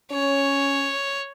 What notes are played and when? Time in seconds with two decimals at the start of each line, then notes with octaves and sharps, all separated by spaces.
0.11 C#4 C#5